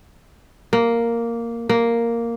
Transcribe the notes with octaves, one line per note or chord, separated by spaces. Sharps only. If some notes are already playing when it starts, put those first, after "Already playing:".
A#3
A#3